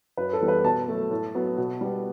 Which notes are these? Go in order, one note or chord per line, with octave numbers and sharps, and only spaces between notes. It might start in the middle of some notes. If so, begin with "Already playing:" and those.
F#2 B4
A4
E3 G3 B3
B4
B2 A5
F#3 A3
A2
F#3 B3
B2
G3 B3